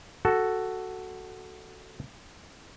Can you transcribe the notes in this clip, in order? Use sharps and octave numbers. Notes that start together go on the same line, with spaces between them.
F#4 A4